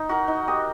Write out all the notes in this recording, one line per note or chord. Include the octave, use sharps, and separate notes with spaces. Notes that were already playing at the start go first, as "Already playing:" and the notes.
Already playing: D#4
F#4 A#4
D#4
G4 A#4 D#5